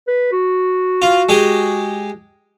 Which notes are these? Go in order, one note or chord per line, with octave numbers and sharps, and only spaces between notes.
B4
F#4
F4
G#3 G4 G#4